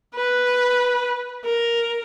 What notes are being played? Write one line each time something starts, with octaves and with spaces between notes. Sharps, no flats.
B4
A#4